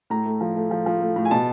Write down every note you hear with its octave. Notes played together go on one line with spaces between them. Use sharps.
A2 A#5
A3
F3
A3
F3
F3
A3
A2
G#5
B2 A5